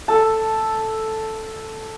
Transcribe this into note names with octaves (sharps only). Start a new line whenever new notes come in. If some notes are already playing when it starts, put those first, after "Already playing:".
A4 A5